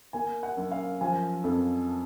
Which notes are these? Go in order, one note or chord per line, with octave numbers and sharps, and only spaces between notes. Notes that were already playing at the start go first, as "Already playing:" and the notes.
A#3 G#5
F#5
F#2
F5
F3 G#5
F2